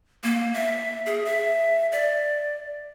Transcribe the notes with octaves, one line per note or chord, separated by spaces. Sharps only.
A#3
E5
G#4
E5
D5